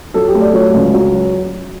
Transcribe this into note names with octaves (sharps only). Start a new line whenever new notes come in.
F#3 A4
G4
A3
D5
F#3 C#5
C#2
F#3